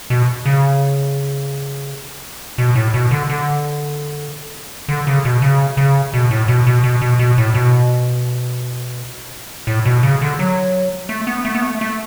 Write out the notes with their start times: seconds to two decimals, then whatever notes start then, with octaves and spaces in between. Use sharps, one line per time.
0.10 B2
0.46 C#3
2.58 B2
2.76 A2
2.94 B2
3.11 D3
3.30 D3
4.88 D3
5.07 C#3
5.25 B2
5.42 C#3
5.77 C#3
6.14 B2
6.31 A2
6.48 B2
6.67 B2
6.84 B2
7.01 B2
7.19 B2
7.38 A2
7.54 B2
9.67 A2
9.85 B2
10.03 C#3
10.22 D3
10.39 F#3
11.09 A3
11.27 B3
11.45 A3
11.55 B3
11.62 A3
11.81 A3